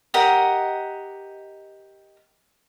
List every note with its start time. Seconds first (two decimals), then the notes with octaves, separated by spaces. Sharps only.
0.14 G4 A#4 D#5 F#5